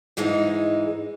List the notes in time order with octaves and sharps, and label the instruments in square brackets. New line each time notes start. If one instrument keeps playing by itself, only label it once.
[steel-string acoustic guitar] G#2 E3 G#3 D#4